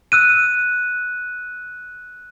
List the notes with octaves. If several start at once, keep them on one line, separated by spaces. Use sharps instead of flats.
E6 F#6 D#7